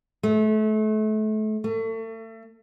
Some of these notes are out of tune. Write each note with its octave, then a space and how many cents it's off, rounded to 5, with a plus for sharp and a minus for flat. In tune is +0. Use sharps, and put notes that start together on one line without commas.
A3 -30
A3 +35